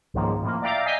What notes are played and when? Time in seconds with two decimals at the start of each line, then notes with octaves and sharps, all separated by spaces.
0.14 C#2 G#2 D#3 F3 A#3
0.42 A2 F3 A#3
0.62 D5 E5 F5 G5 A#5 D6
0.85 D#5 F5 G#5 G6 B6 C7